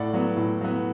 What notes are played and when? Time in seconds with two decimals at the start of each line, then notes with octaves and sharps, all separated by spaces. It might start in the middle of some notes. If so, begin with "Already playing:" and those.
Already playing: A2 D5 F#5
0.14 F#3 B3
0.37 A2
0.61 F#3 B3